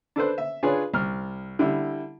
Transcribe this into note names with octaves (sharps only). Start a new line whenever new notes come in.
D4 A4 B4 C5
E5
D4 F4 G#4 B4 C#5
C2 F6
D3 G3 E4